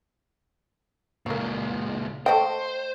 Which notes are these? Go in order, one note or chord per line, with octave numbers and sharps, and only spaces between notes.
C#2 A#2 F#3 A#3
A3 C5 D#5 G5